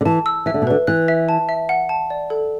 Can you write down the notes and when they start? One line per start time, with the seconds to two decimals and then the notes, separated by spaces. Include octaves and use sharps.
0.01 D3
0.05 E3 A5
0.26 E6
0.46 E3 E5
0.54 D3
0.62 B2
0.67 D3 B4
0.87 E3 F#6
1.08 E5
1.29 A5
1.49 E5
1.69 F#5
1.89 A5
2.10 D5
2.30 A4